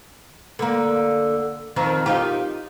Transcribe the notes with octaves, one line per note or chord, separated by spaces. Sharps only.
D3 A#3
F2 D#3 C4
D#4 F4 G4